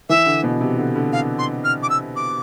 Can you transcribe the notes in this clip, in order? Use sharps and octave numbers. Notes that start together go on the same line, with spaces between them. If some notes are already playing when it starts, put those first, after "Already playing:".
E3 E5
D3
B2
C3
D3
D3
F5
C6
F6
D6
E6
D6